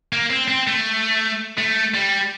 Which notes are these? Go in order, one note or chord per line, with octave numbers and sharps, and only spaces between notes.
A#3
C4
C4
A3
A3
G3